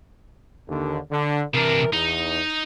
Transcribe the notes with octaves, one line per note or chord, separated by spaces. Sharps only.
D#2 D3
D3
C3 E3 D4 A#4
E2 D#4